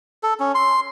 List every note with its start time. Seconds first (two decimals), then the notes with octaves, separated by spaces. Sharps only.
0.23 A4
0.40 C#4
0.55 C6